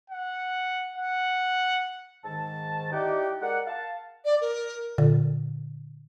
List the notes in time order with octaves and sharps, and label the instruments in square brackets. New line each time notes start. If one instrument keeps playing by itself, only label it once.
[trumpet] F#5
F#5
[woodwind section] G#2 D#3 A5
D#4 E4 G4 D5 F#5 G5
G#3 A#4 D5 F#5
F5 A5
[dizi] D5
A#4
[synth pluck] A#2 D3